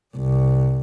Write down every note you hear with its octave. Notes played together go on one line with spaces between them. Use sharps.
C2